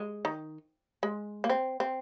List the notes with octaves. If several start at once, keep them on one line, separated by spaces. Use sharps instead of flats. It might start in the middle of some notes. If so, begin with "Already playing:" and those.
Already playing: G#3
D#3
G#3
A#3
C4
C4